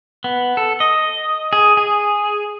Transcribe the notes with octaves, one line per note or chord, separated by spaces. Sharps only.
B3
A4
D#5
G#4
G#4